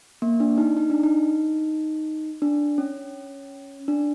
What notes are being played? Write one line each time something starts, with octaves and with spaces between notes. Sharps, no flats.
A#3
D4
D#4
D#4
D4
D#4
D4
C#4
D4